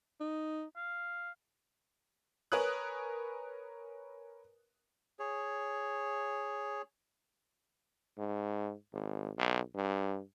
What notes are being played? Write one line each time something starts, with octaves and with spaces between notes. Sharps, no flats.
D#4
F5
A#4 B4 C#5 G#5 D#6 F#6
G#4 C#5
G#2
G#1
B1
G2